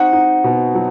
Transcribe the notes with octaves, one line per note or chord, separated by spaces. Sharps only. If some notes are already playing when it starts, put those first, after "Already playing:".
Already playing: C4 D#4 F#4 F#5
D#4
B2
F#3